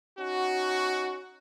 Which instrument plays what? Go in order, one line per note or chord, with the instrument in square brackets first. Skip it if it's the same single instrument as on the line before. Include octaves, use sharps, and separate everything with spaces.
[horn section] C#4 D#4 F#4